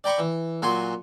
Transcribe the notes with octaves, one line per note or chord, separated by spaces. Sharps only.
D5 G5 A#5 B5 C#6
E3
A#2 F#3 F#4 G#5 C6